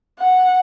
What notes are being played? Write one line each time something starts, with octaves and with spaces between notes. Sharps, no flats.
F#5